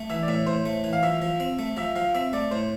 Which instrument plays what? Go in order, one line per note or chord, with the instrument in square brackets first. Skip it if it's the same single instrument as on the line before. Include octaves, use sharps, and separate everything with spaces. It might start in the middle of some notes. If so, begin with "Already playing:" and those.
Already playing: [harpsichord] A3
[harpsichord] E3 [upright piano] E5
[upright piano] D5
[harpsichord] A2 [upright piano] E5
[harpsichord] A2 [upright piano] C5
[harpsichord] A3
E3
[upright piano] F5
[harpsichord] F3 [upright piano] E5
[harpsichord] F3
C4
A3
[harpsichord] F3 [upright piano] E5
[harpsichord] F3 [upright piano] F5
[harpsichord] C4 [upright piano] E5
[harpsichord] A3 [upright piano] D5
[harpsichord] A2 [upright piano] C5